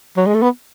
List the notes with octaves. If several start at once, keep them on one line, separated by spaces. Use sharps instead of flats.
F#3
G#3
A3
B3